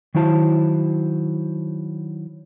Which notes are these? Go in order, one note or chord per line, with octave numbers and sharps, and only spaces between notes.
D#3 F#3 E4 C5 A5